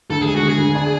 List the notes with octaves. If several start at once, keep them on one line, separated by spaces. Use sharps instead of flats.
D2 A4
G#3 G#4
F#4
D3
G#4
D2
D4